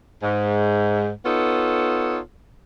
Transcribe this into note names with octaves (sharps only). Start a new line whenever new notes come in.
G#2
B3 D#4 F4 A4 C#5